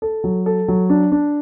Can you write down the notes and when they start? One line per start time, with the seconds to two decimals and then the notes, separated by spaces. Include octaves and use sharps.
0.02 A4
0.24 F#3
0.46 A4
0.68 F#3
0.90 D4
1.12 D4